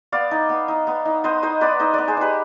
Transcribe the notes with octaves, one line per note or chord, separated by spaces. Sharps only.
B3 D5 F5
D#4
B3
D#4
B3
D#4
B3 C5 D#5
D#4 C5 D#5
B3 B4 D5
D#4 C5 D#5
B3 B4 D5
G#4 C5
D#4 G4 B4